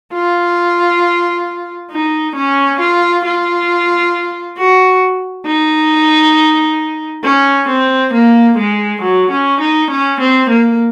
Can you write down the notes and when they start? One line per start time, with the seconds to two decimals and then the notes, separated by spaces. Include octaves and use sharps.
0.14 F4
1.92 D#4
2.36 C#4
2.80 F4
3.25 F4
4.58 F#4
5.46 D#4
7.24 C#4
7.68 C4
8.14 A#3
8.58 G#3
9.02 F#3
9.32 C#4
9.61 D#4
9.91 C#4
10.20 C4
10.50 A#3